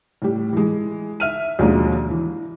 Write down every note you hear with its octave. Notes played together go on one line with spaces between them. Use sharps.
A2 G3
E3 G#3
E5 F6 D#7
D#2 B2 F3 G#3 A#3 D4
E3